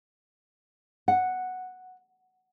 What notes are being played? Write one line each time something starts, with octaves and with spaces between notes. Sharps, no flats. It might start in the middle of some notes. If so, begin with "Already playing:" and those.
F#5